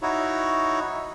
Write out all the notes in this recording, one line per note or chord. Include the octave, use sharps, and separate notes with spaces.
D#4 E4 F#4 C#5